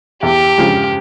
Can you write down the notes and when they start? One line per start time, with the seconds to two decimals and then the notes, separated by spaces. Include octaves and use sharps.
0.23 E2 G4
0.58 C#3 F3 G#3